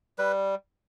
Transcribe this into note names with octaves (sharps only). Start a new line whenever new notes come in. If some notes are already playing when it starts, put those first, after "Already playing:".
G3 B4